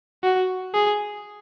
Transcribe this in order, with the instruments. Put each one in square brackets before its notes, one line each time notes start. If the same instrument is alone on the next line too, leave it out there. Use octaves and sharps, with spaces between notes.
[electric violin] F#4
G#4